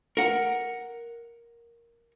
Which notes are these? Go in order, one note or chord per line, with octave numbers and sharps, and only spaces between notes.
A#4 F#5